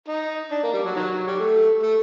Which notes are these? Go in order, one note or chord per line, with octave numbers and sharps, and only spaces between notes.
D#4
D4
A#3
G3
F#3
D#3 F#3
G3
A3
A3